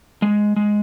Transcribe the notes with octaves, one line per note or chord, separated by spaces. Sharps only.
G#3
G#3